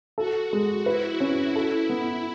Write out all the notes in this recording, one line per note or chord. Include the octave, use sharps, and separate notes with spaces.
F#4 A4
G#3
E4 B4
C#4
E4 A4
B3